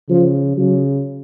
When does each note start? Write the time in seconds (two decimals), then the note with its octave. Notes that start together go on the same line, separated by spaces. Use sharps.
0.09 C#3 F3
0.57 C#3 F#3